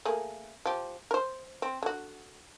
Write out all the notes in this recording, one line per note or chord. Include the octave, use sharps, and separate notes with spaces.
A3 A#3 G#4
F3 G4
A#4 C5
C4
D3 F#4